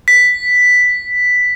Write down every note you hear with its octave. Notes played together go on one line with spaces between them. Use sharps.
B6